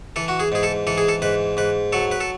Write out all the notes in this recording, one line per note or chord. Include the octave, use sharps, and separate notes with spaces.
E3 A4
F#4
G#4
G#2 G#4
A4
E3 A4
G#4
A4
G#2 B4
G#2 B4
F#3 A4
B4
A4